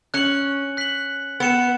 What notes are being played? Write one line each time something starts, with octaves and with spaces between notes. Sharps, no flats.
C#4 F#6 C#7 F#7
F#6 B6 F#7
B3 F#6 C#7 E7